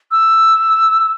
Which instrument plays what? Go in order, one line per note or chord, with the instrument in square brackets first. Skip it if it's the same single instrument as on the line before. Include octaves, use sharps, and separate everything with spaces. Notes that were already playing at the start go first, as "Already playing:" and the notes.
[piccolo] E6